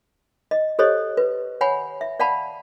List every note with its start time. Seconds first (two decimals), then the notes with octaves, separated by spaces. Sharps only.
0.51 D#5
0.79 G4 A4 C5 C#5 D#5
1.17 B4
1.61 C#5 F#5 G#5 B5
2.01 E5
2.20 D5 F5 F#5 A5 B5